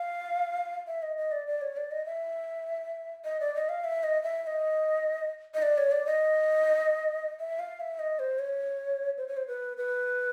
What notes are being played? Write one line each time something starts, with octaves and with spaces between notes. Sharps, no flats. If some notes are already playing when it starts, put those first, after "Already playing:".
Already playing: F5
E5
D#5
D#5
D5
D5
C#5
D5
D#5
E5
D#5
D5
D#5
F5
E5
D#5
E5
E5
D#5
D#5
D5
C#5
D5
D#5
E5
F5
E5
D#5
C5
C#5
C5
C#5
C5
B4
B4